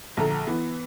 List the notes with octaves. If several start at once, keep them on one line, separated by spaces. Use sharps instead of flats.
A#1 D3 A4 A#5
E3 B3